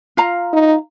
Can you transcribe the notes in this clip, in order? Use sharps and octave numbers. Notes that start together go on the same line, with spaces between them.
F4 F5 A#5
D#4